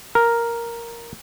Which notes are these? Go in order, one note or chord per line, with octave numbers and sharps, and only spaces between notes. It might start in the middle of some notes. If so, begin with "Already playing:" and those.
A#4